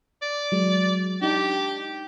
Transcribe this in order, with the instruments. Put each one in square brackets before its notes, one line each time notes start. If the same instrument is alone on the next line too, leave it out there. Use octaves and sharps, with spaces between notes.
[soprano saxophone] D5
[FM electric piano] F#3 G#3
[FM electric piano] D4 D#4 A5 [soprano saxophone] G4